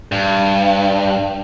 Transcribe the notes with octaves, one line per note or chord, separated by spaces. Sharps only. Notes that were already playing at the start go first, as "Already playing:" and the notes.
G2